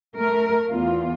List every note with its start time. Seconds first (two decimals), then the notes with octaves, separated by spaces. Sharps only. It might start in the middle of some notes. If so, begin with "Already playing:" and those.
0.16 A3 A#4
0.70 E2 F4